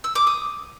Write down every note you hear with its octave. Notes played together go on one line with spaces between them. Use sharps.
E6
D6
D#6